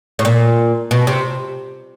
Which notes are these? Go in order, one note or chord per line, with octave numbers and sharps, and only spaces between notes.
A2
A#2
B2
C3